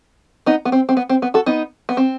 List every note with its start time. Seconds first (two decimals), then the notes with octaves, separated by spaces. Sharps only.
0.46 B3 D#4
0.65 B3
0.72 C4
0.89 C4
0.97 B3
1.09 C4
1.22 B3
1.34 F#4 A4
1.46 B3 D#4
1.89 B3
1.97 C4